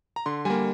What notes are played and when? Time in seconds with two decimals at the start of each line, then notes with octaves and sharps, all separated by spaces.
0.16 A#5
0.26 D3 C6
0.45 G3 A#3 G#5